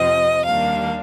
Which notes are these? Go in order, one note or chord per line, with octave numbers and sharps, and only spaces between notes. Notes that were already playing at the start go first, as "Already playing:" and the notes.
Already playing: F2 C3 F3 C4 D#5
D#2 D#3 G3 A#3 D4 F5